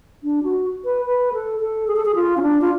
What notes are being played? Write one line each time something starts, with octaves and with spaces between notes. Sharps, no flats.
D4
F#4
B4
B4
A4
A4
G#4
A4
G#4
F4
C#4
D4
F4